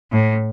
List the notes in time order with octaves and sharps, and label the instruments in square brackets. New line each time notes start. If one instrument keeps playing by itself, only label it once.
[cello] A2